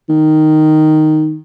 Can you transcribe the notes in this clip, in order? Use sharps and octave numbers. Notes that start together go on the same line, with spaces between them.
D#3